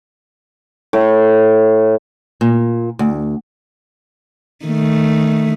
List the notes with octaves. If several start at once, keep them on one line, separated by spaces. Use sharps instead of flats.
A2
A#2
D2
D#3 A3